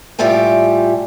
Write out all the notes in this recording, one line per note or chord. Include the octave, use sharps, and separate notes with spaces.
A2 G3 F4 E5 G5 G#5